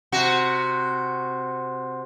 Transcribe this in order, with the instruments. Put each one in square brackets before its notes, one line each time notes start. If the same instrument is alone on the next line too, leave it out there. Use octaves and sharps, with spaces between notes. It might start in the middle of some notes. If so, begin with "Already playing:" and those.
[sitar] C3 F#4